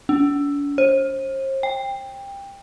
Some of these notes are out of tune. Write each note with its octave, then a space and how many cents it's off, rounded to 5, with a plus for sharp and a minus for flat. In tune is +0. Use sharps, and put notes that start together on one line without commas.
D4 -45
C5 +40
G5 +20